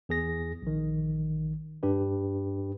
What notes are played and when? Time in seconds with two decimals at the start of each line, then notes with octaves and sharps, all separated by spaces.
0.09 E2 G#4 A#6
0.62 A#1 D#3
1.83 G2 D4 G4 B4